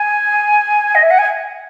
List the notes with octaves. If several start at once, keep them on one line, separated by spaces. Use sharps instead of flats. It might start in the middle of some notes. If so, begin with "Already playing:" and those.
Already playing: G#5
D#5
E5
F#5
G#5